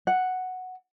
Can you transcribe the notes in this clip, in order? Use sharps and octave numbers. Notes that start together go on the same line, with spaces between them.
F#5